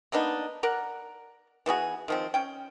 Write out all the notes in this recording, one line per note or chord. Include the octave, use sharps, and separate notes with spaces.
A#3 B3 D4 D#4
A#4 D5 F#5
E3 B3 F#4 G#4
D#3 F3 C4
C#4 G5